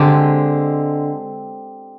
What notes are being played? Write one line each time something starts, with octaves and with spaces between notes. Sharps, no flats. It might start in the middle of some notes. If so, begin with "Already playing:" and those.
Already playing: D3 G#3 C4 G4